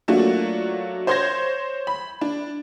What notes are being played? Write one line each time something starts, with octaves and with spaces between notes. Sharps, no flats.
F#3 A3 A#3 D4 F4 F#4
C5 C#5 C6 G6 G#6 A#6
B5
D4